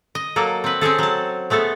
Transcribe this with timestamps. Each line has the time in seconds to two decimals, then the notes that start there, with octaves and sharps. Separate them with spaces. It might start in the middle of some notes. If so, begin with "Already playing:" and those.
0.15 D#5
0.36 F#3 A#3 A4
0.64 C4 B4
0.81 C4 C#4 G#4 A4
0.99 F#3 A5
1.50 G#3 A3 B3 A4